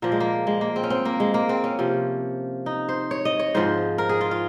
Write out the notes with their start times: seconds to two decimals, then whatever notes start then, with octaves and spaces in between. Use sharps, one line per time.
0.02 A#2 F3 A#3
0.12 G#3
0.20 A#3
0.47 G#3
0.61 A#3
0.76 C4
0.83 C#4
0.90 C4
1.05 A#3
1.20 G#3
1.34 A#3
1.49 C4
1.64 C#4
1.79 C3 F3
2.66 D#4
2.89 C5
3.11 C#5
3.25 D#5
3.39 C#5
3.54 G#2 F3 C5
3.98 A#4
4.09 G#4
4.21 F4
4.31 F4